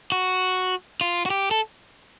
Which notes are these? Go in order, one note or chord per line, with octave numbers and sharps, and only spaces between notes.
F#4
F4
F#4
G4
A4